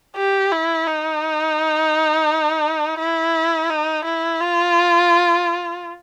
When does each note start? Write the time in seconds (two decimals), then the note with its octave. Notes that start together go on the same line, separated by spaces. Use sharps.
0.16 G4
0.52 E4
0.87 D#4
2.99 E4
3.70 D#4
4.05 E4
4.40 F4